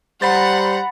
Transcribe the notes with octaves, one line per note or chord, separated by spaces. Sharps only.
G3 C5 F#5 A#5 B5 A6